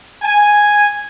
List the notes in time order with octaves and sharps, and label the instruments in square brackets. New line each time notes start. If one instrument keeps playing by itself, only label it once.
[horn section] G#5